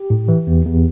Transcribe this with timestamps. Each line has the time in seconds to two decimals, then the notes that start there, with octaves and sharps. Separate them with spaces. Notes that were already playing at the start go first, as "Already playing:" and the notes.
Already playing: G4
0.10 A2
0.28 E3
0.47 E2
0.65 E2